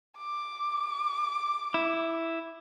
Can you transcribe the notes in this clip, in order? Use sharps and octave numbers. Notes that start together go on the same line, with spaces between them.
D6
E4